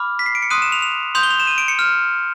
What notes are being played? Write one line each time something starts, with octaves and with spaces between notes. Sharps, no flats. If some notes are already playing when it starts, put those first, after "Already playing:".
Already playing: B5 D6 F6
B6
C7
D7
C#7
C6 D#6 F#6 D#7
E7
F7
F7
C6 D#6 G6 F7
G7
F7
E7
D#7
D7
C#7
F6